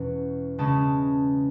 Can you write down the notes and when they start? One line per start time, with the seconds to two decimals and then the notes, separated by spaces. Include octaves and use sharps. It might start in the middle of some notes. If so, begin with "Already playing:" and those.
Already playing: E2 B2 C#4
0.58 C#3 G#3 C#4 A5